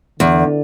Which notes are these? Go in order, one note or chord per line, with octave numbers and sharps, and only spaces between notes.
E2 D3